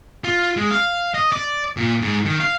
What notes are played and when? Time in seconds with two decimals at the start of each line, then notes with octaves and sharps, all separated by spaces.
0.24 F4
0.57 G#3
0.71 F5
1.14 D#5
1.32 D5
1.77 A#2
2.02 G#2
2.25 D#3
2.40 F5